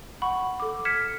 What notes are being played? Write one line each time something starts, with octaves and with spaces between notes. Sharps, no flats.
F#5 B5 C#6
A4 D6
F6 G#6 B6 C#7 E7